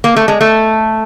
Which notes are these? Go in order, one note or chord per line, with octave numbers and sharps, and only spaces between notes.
A#3
A3
G#3
A3